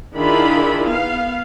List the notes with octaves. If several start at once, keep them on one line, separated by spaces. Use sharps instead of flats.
D#3 D4 E4 F4 G#4 B5
B3 F5